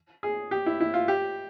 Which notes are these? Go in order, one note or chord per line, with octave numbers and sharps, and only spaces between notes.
G#4
G4
E4
E4
F4
G4